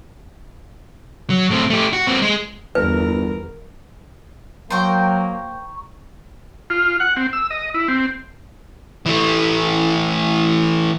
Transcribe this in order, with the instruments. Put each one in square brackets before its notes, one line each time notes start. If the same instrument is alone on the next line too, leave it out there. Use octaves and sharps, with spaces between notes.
[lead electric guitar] F#3
A2 C4
A3 G4
F#4
A#3 C4
G#3
[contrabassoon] G1 [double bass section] E2 [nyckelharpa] A#4 [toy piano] B4
[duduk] F#3 [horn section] A#3 [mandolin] C5 G5 [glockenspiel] A#5 C#6
[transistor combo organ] F4
F#5
C4
E6
D#5
E4
C4
[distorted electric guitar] E3 A3